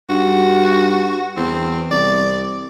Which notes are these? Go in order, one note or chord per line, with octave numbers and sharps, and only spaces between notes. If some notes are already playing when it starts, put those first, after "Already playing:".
G2 F#4
E2 C4
C2 D5